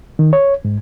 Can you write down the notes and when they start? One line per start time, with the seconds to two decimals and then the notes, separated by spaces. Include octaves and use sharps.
0.19 D#3
0.33 C#5
0.65 G#2